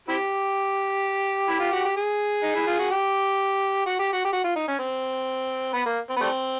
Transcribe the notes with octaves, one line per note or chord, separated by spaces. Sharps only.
C4 E4 G4
E4
F4
F#4
G4
G#4
D#4
E4
F4
F#4
G4
F#4
G4
F#4
G4
F#4
F4
D#4
C#4
C4
B3
A#3
C4
B3
G3 A3 C4